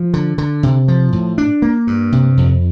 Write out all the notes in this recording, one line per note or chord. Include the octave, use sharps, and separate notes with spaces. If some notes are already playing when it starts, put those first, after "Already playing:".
Already playing: F3
D3
D3
C3
F3
A2
D4
A#3
G2
C3
F2